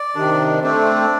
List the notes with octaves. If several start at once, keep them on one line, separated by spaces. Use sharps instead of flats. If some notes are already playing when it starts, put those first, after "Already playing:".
Already playing: D5
C3 D#3 D4
A3 C4 D4